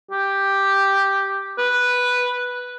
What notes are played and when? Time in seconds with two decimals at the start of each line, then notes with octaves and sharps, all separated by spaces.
0.11 G4
1.58 B4